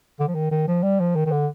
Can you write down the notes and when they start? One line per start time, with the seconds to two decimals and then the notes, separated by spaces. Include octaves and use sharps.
0.20 D3
0.28 F3
0.35 D#3
0.51 D#3
0.68 F3
0.83 G3
1.00 F3
1.16 D#3
1.26 D#3
1.32 D3